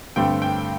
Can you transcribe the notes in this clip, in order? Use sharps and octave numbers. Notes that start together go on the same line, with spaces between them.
G2 D3 A3 C4 G5
G5